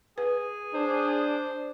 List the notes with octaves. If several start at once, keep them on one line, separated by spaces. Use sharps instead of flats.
G#4 B4
D4 C5